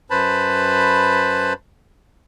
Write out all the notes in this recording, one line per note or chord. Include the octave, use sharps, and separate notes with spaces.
F#2 B4 C5 A5 B5